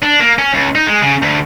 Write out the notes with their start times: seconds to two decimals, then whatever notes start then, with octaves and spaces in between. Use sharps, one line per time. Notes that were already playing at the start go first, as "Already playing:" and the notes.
0.03 D4
0.20 A#3
0.38 C#4
0.54 C#2
0.75 D#4
0.87 G#3
1.02 C#3
1.22 D2